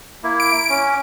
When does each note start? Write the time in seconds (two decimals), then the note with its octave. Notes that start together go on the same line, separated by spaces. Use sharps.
0.23 A#3 E4
0.40 D7
0.69 C#4